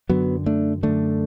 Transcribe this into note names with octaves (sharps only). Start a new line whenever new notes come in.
F#2 D3 F#3 B3
A3 D4
F#2 D3 A3 D4